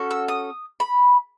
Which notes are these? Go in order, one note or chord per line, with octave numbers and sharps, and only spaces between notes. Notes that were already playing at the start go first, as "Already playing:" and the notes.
Already playing: C#4 F#4 A4
E6
D#6
B5